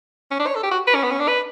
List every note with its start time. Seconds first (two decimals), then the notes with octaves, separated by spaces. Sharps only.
0.31 C#4
0.39 D4
0.47 C#5
0.55 A4
0.63 G4
0.71 F#4
0.87 B4
0.95 C#4
1.03 B3
1.12 C#4
1.20 D4
1.28 B4